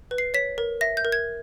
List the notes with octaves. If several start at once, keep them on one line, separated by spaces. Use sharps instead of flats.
B4
C7
C#5 B6
A#4
E5 A#6
G6
A#4
G#6